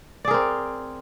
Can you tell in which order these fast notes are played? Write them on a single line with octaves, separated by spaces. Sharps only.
D5 G#4 A#4 C4